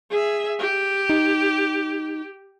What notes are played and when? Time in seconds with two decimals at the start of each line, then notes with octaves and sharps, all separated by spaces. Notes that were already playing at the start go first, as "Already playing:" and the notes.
0.11 G#4 E5
0.59 G4
1.10 D#4